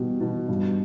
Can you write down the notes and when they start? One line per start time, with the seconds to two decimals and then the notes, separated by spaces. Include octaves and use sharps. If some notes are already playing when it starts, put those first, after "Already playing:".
Already playing: B2 G3
0.20 B2
0.49 G2